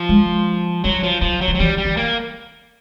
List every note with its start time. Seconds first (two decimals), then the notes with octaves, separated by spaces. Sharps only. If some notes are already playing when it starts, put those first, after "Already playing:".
Already playing: F3
0.09 G#3
0.84 F#3 G3
1.03 F3
1.21 F3 F#3
1.41 F#3
1.48 F3
1.55 F#3
1.59 E3 G3
1.78 G3
1.85 E3
1.97 A#3